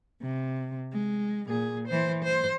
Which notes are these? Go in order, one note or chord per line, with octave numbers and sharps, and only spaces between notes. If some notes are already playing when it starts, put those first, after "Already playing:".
C3
G#3
A#2 G#4
E3 C5
C5